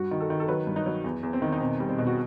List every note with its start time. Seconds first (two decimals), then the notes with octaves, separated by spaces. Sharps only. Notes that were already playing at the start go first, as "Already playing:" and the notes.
Already playing: G2 F#4
0.11 D#3
0.20 A4
0.30 D#3
0.40 A4
0.48 F#3 B4
0.67 G2
0.76 D#4
0.86 F#3
1.04 E2
1.23 E2
1.33 C4
1.42 D#3
1.53 D#4
1.61 B2 C4
1.80 G3
1.89 C4
1.98 B2
2.07 F#4